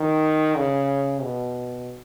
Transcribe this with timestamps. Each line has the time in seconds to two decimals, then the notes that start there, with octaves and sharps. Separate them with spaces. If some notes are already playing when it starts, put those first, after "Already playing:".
Already playing: D#3
0.57 C#3
1.22 B2